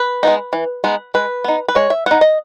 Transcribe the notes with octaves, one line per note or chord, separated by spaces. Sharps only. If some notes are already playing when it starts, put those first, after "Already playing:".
Already playing: B4
G#3 B3 D#4
E3
G#3 B3 D#4
G#3 B4
B3 D#4
B4
G#3 C#5
E5
B3 D#4 F#5
D#5